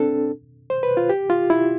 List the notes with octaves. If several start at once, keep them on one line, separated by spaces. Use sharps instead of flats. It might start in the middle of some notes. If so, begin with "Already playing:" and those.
Already playing: C4 D4 A4
C5
B4
F4
G4
F4
E4